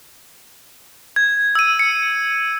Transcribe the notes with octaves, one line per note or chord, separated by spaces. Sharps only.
G#6
E6 D#7
C#7